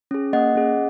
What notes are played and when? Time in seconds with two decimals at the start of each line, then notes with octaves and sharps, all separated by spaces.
0.11 C#4 G#4
0.33 A#3 D#5 F#5
0.55 C#4 G#4